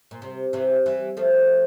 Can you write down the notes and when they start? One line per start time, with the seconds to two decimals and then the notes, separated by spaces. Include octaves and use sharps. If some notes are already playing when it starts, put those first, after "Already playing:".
0.11 A#2
0.22 C3
0.53 C3 E3
0.86 E3 G3
1.17 F3 A3